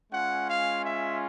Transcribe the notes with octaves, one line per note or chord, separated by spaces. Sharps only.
G#3 C#4 F4 F#5
F5
E5